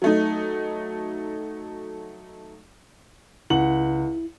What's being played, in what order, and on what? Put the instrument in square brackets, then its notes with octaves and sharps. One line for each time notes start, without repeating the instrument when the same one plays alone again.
[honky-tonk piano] F#3 A3 D#4
[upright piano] C#2 F#5 F#7 [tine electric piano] E4